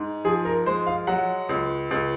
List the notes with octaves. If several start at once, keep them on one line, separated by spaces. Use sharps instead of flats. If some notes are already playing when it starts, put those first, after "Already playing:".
Already playing: G#2
F3 G#4
A#4
G#3 C5
F5
F#3 F#5
C#2
C#2